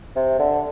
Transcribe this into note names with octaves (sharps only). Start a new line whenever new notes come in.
C3
D3